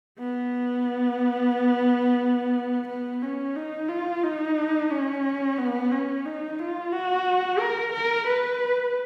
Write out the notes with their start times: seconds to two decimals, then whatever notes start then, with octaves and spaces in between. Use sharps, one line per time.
0.19 B3
2.88 B3
3.22 C#4
3.56 D#4
3.89 F4
4.23 D#4
4.90 C#4
5.58 B3
5.91 C#4
6.25 D#4
6.59 F4
6.92 F#4
7.59 A#4
7.92 A#4
8.27 B4